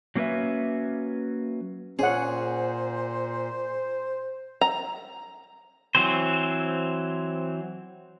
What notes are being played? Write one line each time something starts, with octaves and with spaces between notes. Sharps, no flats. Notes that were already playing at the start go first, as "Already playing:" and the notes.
F#3 A#3 C#4 A#4 B4 E5
A#2 C#4 G#4 C5 F#5
A#5
E3 F#3 C4 C5